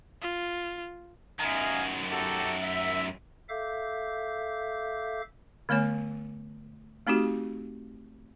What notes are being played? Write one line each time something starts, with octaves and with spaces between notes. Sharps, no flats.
F4
F#2 D#3 D#5 F5 G#5
F#4 G4 A4
E5
A4 E5 F5 D6 G6
D3 A3 B3 C#5 G#5
A3 C4 D#4 F#4 G4